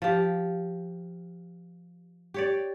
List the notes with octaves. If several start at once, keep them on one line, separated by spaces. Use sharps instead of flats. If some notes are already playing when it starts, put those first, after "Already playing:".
F3 G4
G4 C#5 D5